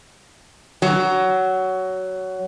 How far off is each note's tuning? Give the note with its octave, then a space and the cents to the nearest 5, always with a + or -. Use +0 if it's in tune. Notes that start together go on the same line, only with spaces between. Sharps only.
F#3 +15